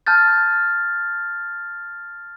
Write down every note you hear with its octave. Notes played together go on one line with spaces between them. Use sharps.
A5 F6 G6 A6